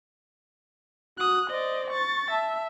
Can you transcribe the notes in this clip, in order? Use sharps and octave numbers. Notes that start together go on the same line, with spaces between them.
F#4 D#6 F#6
C5 D5 D#5
C#6 A6
E5 A5